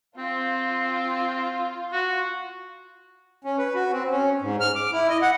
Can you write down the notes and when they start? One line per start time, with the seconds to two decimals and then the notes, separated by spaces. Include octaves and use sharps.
0.18 C4 F4
1.92 F#4
3.44 C#4
3.58 B4
3.75 F#4
3.92 C4
4.11 C#4
4.41 G#2
4.61 F6
4.75 D6
4.92 E4
5.09 D#5
5.22 F#5